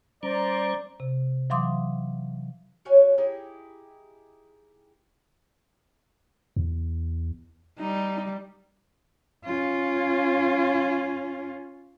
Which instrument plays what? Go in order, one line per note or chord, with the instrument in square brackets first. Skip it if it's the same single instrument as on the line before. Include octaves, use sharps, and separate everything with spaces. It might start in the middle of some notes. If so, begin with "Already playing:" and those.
[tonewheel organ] G3 C#4 [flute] C5 [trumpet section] D5 A#5
[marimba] C3
E3 F#3 F5 C6 D6 D#6
[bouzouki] C#4 F#4 C#5 G#5
D#4 E4 G4 G#4
[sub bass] E2
[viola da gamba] G3 [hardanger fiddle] D#4
[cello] C#4 F4